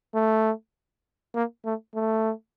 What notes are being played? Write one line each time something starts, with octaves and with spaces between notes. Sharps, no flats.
A3
A#3
A3
A3